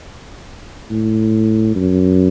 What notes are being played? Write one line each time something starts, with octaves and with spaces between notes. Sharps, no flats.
A2
F#2